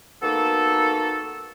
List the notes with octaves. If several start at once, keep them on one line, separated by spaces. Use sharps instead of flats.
A#3 B3 D#4 F#4 A4